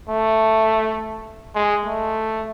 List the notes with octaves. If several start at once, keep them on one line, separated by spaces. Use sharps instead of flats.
A3
G#3
A3